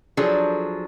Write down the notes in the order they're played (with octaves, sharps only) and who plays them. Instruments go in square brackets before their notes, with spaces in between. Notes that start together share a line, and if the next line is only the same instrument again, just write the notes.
[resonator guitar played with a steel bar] F3 F#3 D4 G#4 A4